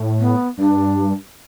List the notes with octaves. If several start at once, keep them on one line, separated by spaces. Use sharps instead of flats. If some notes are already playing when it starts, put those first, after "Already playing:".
Already playing: A2
B3
G2 D4